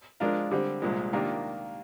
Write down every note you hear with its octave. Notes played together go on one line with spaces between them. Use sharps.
F3 G#3 D4 F4 A#4
D3 G3 C4
C2 A#2 F3 G#3
C3 D#3 A#3 D4 F4